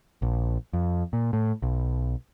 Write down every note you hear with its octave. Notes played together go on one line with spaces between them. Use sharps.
A#1
F2
A#2
A2
B1